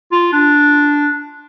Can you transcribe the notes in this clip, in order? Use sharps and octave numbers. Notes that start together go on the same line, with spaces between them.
F4
D4